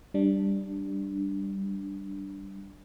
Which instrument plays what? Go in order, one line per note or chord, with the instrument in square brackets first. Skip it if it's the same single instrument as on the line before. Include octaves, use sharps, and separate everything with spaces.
[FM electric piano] G3 D4